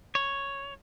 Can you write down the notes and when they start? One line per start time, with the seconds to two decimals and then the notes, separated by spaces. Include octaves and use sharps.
0.15 C#5